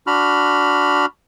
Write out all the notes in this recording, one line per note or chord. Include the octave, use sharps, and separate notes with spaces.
D4 F#4 B5 F6